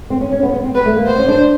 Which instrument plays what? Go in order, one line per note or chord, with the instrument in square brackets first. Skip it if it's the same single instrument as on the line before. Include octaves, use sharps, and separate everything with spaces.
[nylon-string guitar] C4
C#4
C#4
B3
B3
C4
[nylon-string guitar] B3 [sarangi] B4
[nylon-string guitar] A3
A#3
[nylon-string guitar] B3 [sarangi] C5
[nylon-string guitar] C#4
D4